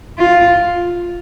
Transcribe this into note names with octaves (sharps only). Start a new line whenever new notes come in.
F4